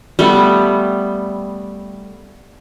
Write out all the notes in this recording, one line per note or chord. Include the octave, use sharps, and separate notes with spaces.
G3 A3 B3